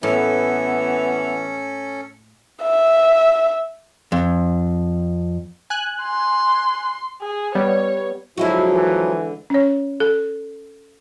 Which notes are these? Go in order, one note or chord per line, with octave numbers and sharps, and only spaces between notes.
A2 E3 A#3 B3 C#4 A4
E5
F2
G#5 F#6
C6
G#4
G3 B3 C#5
D3 F3 F#3 G#3 E4 F#4
E3
C#4 C#5
A4